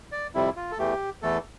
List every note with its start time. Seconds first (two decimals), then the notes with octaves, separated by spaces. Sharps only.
0.12 D5
0.34 F2 C3 G3 E4
0.56 F4
0.72 A4
0.78 E2 E3 A3 G4
1.22 E2 E3 A3 A4